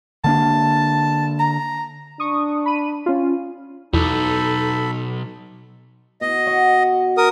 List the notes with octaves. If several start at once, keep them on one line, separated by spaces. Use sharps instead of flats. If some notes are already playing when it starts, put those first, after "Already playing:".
D3 A#3 D4 A5
A#5
D4 C#6 D#6
B5 D#7
C#4 F4
B1 E2 D#4 A4 B5
B2 D#5
F#5 C#6
A#4 D#6